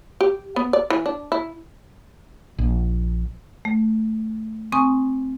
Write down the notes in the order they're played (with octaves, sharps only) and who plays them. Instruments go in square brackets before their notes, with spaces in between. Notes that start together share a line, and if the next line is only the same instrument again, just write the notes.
[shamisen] G4
B3
D5
E3
D4
E4
[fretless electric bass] A#1
[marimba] A3
C4 G#5 C#6 D#6